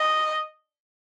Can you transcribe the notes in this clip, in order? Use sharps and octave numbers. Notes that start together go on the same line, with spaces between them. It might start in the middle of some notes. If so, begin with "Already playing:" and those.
Already playing: D#5